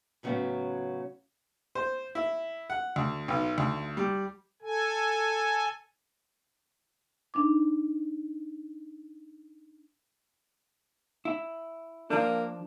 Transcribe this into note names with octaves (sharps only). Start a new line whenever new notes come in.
A2 C#3 F#3 G3 B3 C#4
C5
E4
F#5
D2
B1
D2
G3
A4 G#5
D4 D#4 D6
E4
F3 A#3 D4